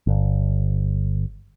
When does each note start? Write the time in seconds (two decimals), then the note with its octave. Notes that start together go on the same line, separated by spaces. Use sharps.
0.07 G1